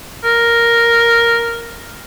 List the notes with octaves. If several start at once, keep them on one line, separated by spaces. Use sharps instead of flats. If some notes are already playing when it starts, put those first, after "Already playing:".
A#4